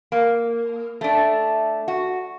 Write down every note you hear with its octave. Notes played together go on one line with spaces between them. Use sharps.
A#3
A3 D4
F#4